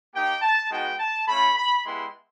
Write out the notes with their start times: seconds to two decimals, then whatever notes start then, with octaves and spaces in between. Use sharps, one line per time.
0.14 A#3 D#4 G4 G5
0.42 A5
0.71 G#3 B3 D#4 F#4 G5
1.00 A5
1.28 A3 C#4 F4 B5
1.56 B5
1.85 G#3 B3 E4 G4 C6